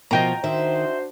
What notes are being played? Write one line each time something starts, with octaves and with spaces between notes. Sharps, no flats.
B2 F3 A#4 D#5 G5 A#5
D#3 D4 F#4 C5 E5